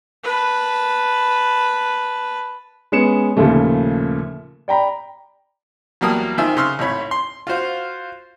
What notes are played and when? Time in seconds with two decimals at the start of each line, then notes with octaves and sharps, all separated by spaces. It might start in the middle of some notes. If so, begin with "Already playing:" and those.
0.23 B4 A5
2.92 G#3 B3 C#4 C#7 E7
3.37 D#2 A#2 C#3 F3 A3
4.68 D5 G5 A#5 B5
6.01 E2 F#3 G3 A#3 A5 D#6
6.38 D#3 C4 F4 E5 G#5 E6
6.57 C#3 C6 E6 F6
6.79 G#1 A2 C#5 B5
7.11 C6
7.47 F4 F#4 C5 F5